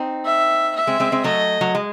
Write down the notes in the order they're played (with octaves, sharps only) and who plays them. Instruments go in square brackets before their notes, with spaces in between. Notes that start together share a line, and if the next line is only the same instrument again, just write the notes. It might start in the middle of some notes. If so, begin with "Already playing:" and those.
Already playing: [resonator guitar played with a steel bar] C4 D#4
[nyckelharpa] E5
E5
[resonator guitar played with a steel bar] G#3 C4
G#3 C4
G#3 C4
[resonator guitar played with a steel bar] F#3 A3 [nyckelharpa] D#5
[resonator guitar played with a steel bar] F#3
G#3